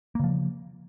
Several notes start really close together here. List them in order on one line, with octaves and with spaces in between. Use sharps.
A#3 C#3 F3